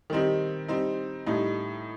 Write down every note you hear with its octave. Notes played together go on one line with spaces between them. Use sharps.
D#3 G3 C4 D#4 G4
G3 C4 D#4
A2 G3 D#4